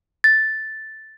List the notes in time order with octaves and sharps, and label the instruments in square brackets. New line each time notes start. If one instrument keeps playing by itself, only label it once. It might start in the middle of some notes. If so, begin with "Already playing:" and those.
[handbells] A6